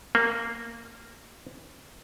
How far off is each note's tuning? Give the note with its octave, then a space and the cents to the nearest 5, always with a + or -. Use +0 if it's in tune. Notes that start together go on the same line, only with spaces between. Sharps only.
A#3 -15